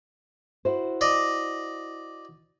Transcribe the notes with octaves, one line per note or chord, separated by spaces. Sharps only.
E4 F#4 C5
D5 D#5